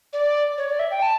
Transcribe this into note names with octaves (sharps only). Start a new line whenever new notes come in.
D5
C#5
D5
E5
G5
A5